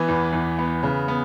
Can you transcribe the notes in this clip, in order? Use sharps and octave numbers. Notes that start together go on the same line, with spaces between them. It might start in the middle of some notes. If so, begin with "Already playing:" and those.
Already playing: E3 B3 B4
E2
E2
B3
C#3
B3